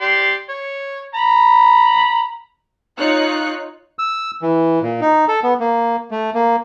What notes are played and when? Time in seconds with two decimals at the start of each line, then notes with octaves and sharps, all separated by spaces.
0.01 G4 D5 C6
0.49 C#5
1.15 A#5 B5
2.99 D#4 F4 C#5 F#6 C#7
3.99 E6
4.42 E3
4.82 A#2
5.01 D#4
5.28 A4
5.43 B3
5.60 A#3
6.11 A3
6.34 A#3